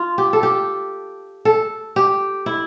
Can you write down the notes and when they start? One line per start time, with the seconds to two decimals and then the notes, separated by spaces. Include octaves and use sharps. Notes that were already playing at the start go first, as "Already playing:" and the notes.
Already playing: F4
0.18 G4
0.33 A4
0.43 G4
1.45 A4
1.96 G4
2.46 E4